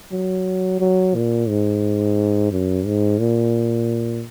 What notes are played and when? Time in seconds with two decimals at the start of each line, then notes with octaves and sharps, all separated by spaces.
0.12 F#3
0.80 F#3
1.15 A#2
1.49 G#2
2.52 F#2
2.86 G#2
3.19 A#2